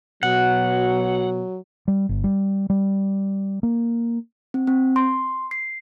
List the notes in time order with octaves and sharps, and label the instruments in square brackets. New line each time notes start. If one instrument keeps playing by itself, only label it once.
[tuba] B2 [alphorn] F#3 [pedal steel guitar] F#5
[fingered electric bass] G3
G1
G3
G3
A#3
[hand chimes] C4
C4
C6
C7